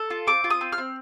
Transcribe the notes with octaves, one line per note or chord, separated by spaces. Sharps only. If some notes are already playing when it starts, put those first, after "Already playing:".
Already playing: A4
F4
C4 D6
F4
D#6
C4
F6
C4